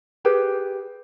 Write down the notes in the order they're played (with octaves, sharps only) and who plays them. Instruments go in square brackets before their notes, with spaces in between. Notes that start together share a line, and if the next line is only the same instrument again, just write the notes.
[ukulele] G4 G#4 B4